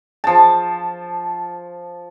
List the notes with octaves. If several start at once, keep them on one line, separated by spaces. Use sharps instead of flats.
F3 A5